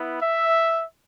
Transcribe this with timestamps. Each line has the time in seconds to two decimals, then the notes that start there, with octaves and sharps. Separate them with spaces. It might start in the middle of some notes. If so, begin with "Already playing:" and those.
Already playing: B3 E4
0.22 E5